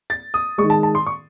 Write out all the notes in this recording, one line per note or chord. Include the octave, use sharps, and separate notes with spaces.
A6
D#6
D#3 G#3 C#6
A5
A5
C6
C#6